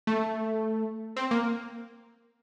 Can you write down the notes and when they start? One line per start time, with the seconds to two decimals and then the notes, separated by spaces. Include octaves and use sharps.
0.07 A3
1.16 C4
1.31 A#3